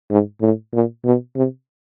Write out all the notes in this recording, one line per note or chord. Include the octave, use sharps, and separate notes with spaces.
G#2
A2
A#2
B2
C3